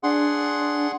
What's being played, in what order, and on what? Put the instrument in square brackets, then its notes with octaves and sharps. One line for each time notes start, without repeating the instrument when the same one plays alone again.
[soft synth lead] D4 [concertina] G#4 F#5 C6